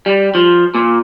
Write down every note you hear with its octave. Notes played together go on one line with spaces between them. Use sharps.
G3
F3
A#2